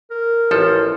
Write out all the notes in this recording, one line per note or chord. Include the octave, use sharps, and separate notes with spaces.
A#4
A1 F3 A4